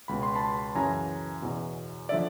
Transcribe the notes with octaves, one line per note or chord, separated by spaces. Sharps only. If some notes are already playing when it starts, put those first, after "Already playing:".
C#2 B2 B5
C6
A5 B5
F#2 C#3 E3 G#5 A#5
E2 B2
D3 F3 D5 E5